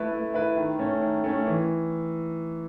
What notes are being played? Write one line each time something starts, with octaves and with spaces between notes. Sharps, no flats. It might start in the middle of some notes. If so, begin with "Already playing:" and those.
Already playing: A3 E4 B4
A3
E4 B4
D#3
A3 C#4
D#3
A3 C#4
E3